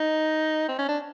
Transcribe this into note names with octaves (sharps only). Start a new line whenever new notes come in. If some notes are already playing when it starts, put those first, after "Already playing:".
Already playing: D#4
C4
C#4
D4